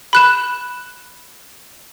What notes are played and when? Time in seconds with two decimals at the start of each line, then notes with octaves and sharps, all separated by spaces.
0.13 B5 F#6 E7